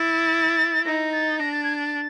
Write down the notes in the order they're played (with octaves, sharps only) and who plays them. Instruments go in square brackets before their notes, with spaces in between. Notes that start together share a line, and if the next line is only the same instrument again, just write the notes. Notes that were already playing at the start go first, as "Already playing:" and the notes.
Already playing: [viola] E4 [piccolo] A6
[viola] D#4 [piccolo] A#6
[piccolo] A6
[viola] D4 [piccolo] A#6
[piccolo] A6
G#6
A6